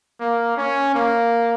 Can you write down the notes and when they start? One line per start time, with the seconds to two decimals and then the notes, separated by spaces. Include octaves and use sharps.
0.20 A#3
0.57 C#4
0.95 A#3